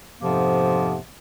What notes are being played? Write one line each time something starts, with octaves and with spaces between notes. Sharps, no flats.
F2 G#2 C3 F3 A#3 B3